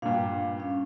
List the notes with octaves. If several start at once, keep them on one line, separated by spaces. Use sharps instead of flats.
G2 A#2 D4 F5
C#4